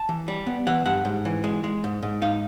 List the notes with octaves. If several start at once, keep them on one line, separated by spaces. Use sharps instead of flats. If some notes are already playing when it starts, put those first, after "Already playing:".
Already playing: A5
E3
G3
B3
E3 F#5
G2 F#5
G#2
E3
G#3
G#3
G#2
G#2
D#4 F5